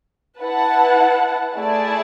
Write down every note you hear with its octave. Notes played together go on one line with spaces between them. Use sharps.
E4 B4 F#5 A5
A3 E4 G#4 D5 A5